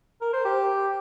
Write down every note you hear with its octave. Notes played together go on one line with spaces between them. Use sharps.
A#4
C5
G4